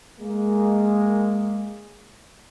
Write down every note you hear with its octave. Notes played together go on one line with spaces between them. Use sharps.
G#3 A#3